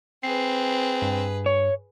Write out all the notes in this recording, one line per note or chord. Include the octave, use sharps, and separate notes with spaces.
C4 G#4 B4 C7
G2
C#5